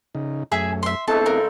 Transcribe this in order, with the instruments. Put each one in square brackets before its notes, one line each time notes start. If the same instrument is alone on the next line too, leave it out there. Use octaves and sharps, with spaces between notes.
[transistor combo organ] C#3 D#4
[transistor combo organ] F#2 A3 [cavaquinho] G#4 E5 G#5
[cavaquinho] E5 C6
[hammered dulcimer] G#3 A3 D4 [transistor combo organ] B3 C4 E4 [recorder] A4 [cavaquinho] A5
[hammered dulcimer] C#3 [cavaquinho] A#4